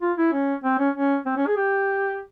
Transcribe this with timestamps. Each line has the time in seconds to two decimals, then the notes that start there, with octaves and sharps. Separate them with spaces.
0.02 F4
0.17 E4
0.33 C#4
0.64 C4
0.79 C#4
0.95 C#4
1.26 C4
1.37 C#4
1.46 G#4
1.57 G4